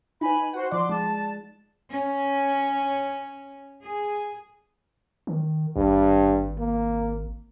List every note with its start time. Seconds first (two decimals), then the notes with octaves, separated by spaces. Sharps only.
0.21 D#4 B4 G#5 B5
0.53 F#4 C5 F#5
0.71 F3 D5 C6 D6
0.89 G#3 A5
1.90 C#4
3.83 G#4
5.27 D#3
5.76 G#1 G2
6.59 A#3